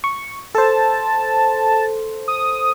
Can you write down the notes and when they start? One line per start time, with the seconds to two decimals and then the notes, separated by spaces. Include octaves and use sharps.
0.04 C#6
0.55 A4 C5 A5
2.28 D#6